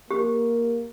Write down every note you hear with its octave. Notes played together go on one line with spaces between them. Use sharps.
A#3 G4